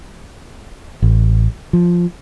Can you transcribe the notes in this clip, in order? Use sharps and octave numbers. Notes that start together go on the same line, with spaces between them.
A1
F3